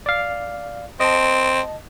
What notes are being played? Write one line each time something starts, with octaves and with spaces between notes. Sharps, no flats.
D5 F5
C4 D#5 A5